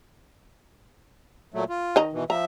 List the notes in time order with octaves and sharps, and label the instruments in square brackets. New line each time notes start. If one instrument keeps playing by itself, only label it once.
[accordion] A#2 F#3 A3
F4
[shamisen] D#3 D#5 A#5
[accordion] B2 E3
[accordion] F3 E5 [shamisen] A#5